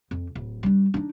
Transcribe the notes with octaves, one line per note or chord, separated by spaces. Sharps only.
F2
D1
G3 D4
D4 D#4